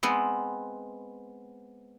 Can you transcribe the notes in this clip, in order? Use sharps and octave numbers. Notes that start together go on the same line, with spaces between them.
G#3 B3 C4